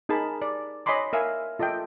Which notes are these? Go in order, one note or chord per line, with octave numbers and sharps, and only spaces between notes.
D#4 G#4 A#4 A5 B5
D5
C#5 D#5 G#5 B5 C6 D6
A#4 E5 F5 G#5
F4 A4 D#5 E5 G5